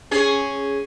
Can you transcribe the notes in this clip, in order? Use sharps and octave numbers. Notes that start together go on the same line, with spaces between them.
C#4 G#4 C#5